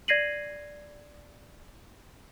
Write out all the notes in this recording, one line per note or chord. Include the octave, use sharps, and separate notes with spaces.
D5 G#6 A#6 C7 D#7 F#7